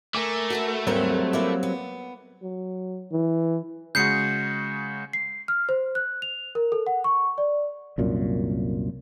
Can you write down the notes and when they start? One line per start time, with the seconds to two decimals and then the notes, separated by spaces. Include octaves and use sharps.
0.15 A3 A#4 G#5 D6
0.50 F#4 A4 B4
0.87 D#2 G#2 F#3 G3 C4 A#4
1.33 A#3 E4 E5
1.63 B3
2.42 F#3
3.12 E3
3.95 C#3 G#3 F#4 G6 C7 C#7
5.13 C7
5.48 F6
5.69 C5
5.95 F#6
6.22 F7
6.55 A#4
6.72 A4
6.87 F#5
7.04 C#6
7.38 D5
7.98 C2 F#2 A#2